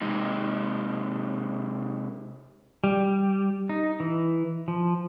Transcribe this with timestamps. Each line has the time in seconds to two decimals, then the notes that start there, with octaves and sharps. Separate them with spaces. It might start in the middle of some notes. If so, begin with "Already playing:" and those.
0.02 C3 G#3 D#4
2.84 G3
3.69 D#4
4.00 E3
4.68 F3